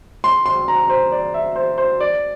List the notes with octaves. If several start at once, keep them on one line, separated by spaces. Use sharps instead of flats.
C6
C6
A#5
C5
D5
E5
C5
C5
D5